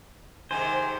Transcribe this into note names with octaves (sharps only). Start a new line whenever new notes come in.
G#2 C3 D#3 C5 G#5